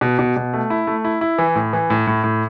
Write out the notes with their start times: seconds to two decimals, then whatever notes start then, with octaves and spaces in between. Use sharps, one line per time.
0.01 B2
0.19 B2
0.36 B2
0.53 A3
0.70 E4
0.87 A3
1.05 E4
1.21 E4
1.38 E3
1.56 A2
1.73 E3
1.90 A2
2.07 A2
2.24 A2